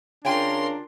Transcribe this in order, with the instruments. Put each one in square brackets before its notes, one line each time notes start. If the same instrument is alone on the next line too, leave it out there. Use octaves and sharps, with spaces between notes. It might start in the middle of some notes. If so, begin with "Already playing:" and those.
[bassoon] C#3 [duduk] D4 [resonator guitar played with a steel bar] F4 G5 G#5 [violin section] A#4 C6